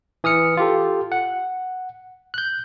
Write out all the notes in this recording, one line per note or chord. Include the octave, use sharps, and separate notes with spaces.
E3 D#6 F6 C#7
F4 G4 A4
F#5
F#6 G6